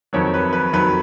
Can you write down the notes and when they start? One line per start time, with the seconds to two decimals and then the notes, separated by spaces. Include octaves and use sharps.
0.13 F2 D#3 F#3 C#5
0.34 B4
0.53 B4
0.73 F2 D#3 F#3 B4